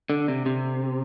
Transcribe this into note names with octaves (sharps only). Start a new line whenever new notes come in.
D3
C3
C3